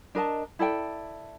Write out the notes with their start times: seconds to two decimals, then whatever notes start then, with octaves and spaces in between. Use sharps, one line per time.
0.15 D4 A#4 D#5 A5
0.59 E4 A4 D5 G5